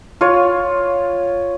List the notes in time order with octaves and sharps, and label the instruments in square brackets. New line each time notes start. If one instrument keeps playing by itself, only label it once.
[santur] F4 C#5